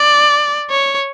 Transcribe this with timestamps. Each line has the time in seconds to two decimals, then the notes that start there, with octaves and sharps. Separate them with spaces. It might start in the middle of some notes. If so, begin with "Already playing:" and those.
Already playing: D5
0.70 C#5